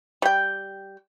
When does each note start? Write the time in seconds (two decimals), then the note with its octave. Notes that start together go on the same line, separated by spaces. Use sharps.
0.22 G3 G5